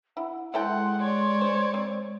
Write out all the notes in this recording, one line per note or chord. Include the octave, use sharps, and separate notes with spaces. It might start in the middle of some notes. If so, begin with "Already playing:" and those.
E4 F#5
G#3 E4 A4 F#5 G5 C6
C#5 D5
C5
C4